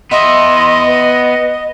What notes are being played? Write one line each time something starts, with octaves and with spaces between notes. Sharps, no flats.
B3 D#5 E5 C6
B4